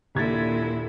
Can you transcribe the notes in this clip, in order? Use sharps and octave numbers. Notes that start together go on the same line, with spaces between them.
D#1 A#2 D3 E4 G#6 A6